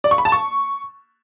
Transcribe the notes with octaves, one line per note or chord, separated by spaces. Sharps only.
D5
C#6
B5
A5
C#6